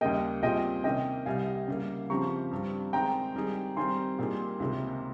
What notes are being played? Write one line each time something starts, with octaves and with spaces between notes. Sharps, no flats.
D#2 C#3 G3 A#3 D#5 G5
A#2 G3 C4 F4 G#4 D#5 G5
C3 D#3 A#3 C#4 D#5 G5
C2 C3 G3 F5 G#5
C#3 G3 A#3
C#3 F3 C4 G4 A#5 C#6
G2 G3 C4
D#3 G#3 C4 G5 A#5
D#3 G3 C4 D#4 G#4
D#3 G3 C4 G#5 C6
A#2 G3 A#3 D#4 G#4
C#2 C3 D#3 A#3